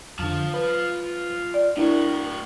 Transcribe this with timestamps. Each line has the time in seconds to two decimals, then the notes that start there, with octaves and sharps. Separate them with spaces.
0.19 F2 D3 F4 A5
0.54 B4
1.54 D5
1.77 A2 D4 E4 F#4 A#4